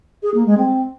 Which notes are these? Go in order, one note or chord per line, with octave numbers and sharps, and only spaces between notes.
G#4
A#3
G#3
C4